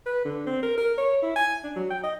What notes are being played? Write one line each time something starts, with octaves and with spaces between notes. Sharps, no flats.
B4
D3
C4
A#4
A#4
C#5
E4
G#5
D4
F#3
G5
D#5